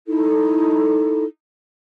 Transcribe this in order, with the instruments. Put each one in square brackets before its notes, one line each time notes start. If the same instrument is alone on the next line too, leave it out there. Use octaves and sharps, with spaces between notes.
[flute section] D#4 E4 A4